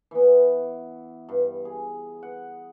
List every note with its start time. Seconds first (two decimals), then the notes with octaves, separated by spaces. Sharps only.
0.11 E3 B3
1.29 G2
1.65 G#4
2.23 F#5